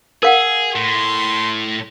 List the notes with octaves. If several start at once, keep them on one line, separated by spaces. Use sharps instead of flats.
G#4 A#4 F5 F#5
A2 C6